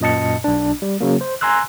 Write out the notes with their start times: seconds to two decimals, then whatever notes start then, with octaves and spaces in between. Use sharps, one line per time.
0.01 F#2 A#2 D#5 A5 C#7
0.44 B1 D4
0.82 G3
1.00 C#3 F#3 A#3
1.21 C5
1.41 G#5 A#5 C6 E6 F#6